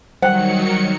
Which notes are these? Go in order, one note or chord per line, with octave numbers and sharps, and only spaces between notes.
D#3 F#3 G3 C5 F#5 G5 C#7